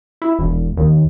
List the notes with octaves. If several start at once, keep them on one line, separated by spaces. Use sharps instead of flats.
E4
E1
D#2